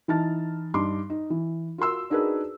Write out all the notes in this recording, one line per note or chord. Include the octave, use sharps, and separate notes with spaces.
E3 D#4 A5 F6 A6
G2 D#4 C6 D6
D#4
E3
F4 F#4 A#4 C6 E6
D4 D#4 F#4 G#4 A#4 B4